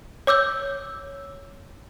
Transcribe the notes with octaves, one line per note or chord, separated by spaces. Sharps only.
C#5 D6 E6 G6